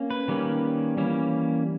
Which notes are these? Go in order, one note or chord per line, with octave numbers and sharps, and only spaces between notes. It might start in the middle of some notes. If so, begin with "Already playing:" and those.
Already playing: A#3 C#4
B4
D#3 G3 A#3 C#4
E3 G3 A#3 C#4